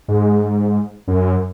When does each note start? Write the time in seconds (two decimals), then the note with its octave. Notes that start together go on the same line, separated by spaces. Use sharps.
0.08 G#2
1.08 F#2